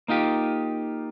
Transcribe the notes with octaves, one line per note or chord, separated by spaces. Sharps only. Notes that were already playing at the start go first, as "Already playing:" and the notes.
A#3 D#4 F4 G4